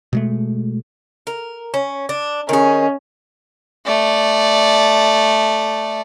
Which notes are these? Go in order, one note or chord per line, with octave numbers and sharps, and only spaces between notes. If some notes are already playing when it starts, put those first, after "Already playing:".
B2 G#3 A3
A#4
C#4
D4
D#3 C#4 G#4
A3 D5